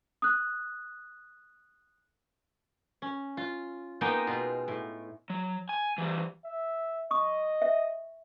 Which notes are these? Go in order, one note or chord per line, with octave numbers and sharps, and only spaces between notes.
D#6 F#6
C#4
F4
G#3 A#3 B3 D#4 D#5 G5
B2 F4
A2
F#3
G#5
E3 G3
E5
D#5 C#6 D#6
E5